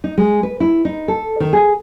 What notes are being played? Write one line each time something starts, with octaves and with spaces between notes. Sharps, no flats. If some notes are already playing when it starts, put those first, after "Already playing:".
D#4
G#3
B4
E4
D#4
A4
D#3
G#4